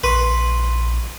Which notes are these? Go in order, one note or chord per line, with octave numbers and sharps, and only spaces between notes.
A#1 B4 C6 C#6